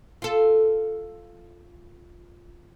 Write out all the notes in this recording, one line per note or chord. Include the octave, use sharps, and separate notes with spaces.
F4 A4